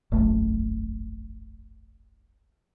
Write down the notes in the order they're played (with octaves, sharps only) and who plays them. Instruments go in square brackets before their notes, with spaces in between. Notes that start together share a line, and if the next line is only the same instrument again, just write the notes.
[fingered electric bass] E1 A#1 F#2 A3